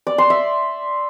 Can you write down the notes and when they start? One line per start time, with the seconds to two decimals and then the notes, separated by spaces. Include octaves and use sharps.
0.07 D5
0.18 C6
0.30 E5